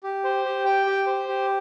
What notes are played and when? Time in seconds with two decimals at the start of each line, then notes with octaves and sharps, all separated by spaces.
0.03 G4
0.24 C5
0.45 G4
0.65 G5
0.87 G4
1.06 C5
1.28 G4